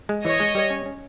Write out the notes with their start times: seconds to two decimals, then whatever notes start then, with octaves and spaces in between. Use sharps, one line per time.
0.09 G#3
0.24 E3 C#5 D#5
0.40 G#3
0.55 G3
0.70 C#4
0.86 C#4